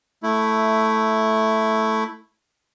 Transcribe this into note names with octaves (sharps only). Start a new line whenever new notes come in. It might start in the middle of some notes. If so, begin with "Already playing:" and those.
A3 E4